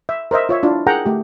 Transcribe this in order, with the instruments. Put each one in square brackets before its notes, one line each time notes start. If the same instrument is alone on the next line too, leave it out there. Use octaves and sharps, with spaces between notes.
[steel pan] E5
A#4 C5 D#5 E5
F4 C#5 E5
D4 E4 F4
G#4 A#4 F#5 G5 A#5
A3 G4